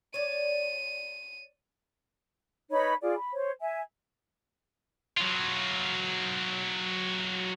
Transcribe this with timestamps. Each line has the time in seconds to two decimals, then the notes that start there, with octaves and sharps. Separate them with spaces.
0.14 C#5 D5 D#7
2.71 D#4 B4 C#5 B5
3.02 F4 G#4 D5
3.16 B5
3.33 C5 C#5
3.61 E5 G#5
5.17 F#3 F4